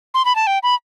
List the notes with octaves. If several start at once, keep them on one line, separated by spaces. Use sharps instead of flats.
C6
B5
A5
G5
B5